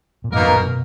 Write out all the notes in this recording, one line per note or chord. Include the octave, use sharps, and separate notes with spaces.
A#2
F2 G#2 B2 A#3 D#4 A#4
F#2 A#2
B2